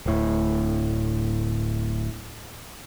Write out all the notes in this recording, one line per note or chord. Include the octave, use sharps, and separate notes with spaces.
D1 A2